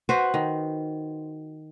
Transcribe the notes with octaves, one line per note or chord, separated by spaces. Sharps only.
F#4 B4 C5
D#3